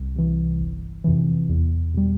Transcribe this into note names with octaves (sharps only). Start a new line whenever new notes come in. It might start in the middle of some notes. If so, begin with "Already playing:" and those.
Already playing: C2
C3 E3
G1
F2 C3 E3
E2
B2 G3